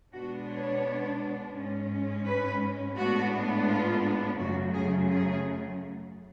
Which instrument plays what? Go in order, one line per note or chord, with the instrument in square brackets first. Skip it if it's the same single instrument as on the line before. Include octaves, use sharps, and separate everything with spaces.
[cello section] B2 G#3 B3 D4 F#4
C#5
G#2 G#3 C#4
B4
A2 G#3 B3 D4 F#4
F4
F#2 C#3 F#3 A3 F#4
G#4
G#4